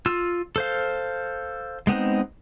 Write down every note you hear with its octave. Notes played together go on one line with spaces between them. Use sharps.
F4 E6
A4 C5 F5
G#3 B3 C4 D#4